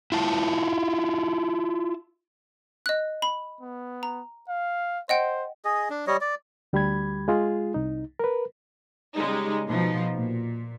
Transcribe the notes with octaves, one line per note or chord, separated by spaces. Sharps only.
E4 F4 A5
D#5 F#6
B5
B3
A#5
F5
C5 D#5 F#5 G5
G#4 D#5
D4
G3 C#5 D#5
D5
D2 G3 G4 B5 G#6
G#3 F4 G#4
C2 D#4
A#4 B4
C#3 G3 G#3 D#4
B2 F3 D#4
A#2